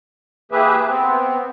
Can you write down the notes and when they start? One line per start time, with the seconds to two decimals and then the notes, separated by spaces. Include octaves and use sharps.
0.52 E3 A#3 G4 G#4 B4 E5
0.88 B3 C4